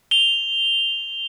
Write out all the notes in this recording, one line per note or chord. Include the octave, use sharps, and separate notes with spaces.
F7 G7